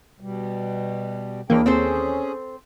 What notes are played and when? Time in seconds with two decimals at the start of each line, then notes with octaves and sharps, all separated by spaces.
0.20 B2 G3
1.50 D#2 E3 A#3 D4 G#4 G5
1.66 C4 C#4 G#4 A4 C5